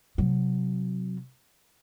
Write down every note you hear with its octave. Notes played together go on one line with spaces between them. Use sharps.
C3 F#3